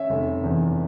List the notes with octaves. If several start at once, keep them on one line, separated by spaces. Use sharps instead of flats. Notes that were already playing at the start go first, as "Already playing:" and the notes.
Already playing: C#4 E5
F1
E2